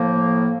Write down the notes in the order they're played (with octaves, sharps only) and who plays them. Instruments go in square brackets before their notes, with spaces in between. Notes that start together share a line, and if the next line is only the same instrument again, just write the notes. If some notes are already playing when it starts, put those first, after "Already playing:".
Already playing: [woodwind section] A2 F3 A#3